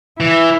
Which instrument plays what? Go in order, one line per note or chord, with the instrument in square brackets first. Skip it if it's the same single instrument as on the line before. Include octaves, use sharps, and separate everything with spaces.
[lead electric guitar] E3 [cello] E4